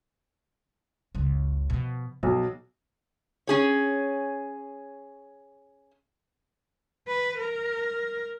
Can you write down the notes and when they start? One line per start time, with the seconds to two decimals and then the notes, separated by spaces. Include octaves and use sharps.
1.15 F#1 C#2
1.70 B2 F3
2.23 B1 F3
3.47 C#4 G#4 C#5
7.08 B4
7.38 A#4